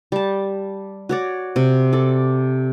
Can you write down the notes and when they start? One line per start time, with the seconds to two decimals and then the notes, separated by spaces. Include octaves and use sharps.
0.12 G3 A5
1.09 F#4 C#5 D5
1.56 C3
1.93 A4 D5